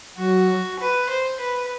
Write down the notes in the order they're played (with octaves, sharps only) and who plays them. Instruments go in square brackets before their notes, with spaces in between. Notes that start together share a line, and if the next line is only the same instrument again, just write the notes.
[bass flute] F#3 [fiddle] F#4
[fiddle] B4
C5
B4